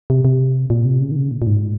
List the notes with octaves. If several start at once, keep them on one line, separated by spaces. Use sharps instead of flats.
C3
C3
A#2
C3
C#3
D#3
C#3
A#2
A#2
G#2